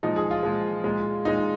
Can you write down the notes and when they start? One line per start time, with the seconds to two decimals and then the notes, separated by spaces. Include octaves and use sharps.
0.03 A#2 F3 G#3 D#4
0.16 G#4
0.31 F4
0.43 A#2 F3 G#3
0.84 A#2 G#3
1.25 A#2 G#3 D#4